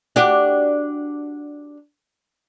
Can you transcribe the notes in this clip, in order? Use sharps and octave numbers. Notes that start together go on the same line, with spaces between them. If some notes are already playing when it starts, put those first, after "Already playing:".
D4 F#4 G4